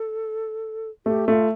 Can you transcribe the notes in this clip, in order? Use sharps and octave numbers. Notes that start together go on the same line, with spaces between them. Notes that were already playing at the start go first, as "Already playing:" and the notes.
Already playing: A4
A3 G4
A3 F4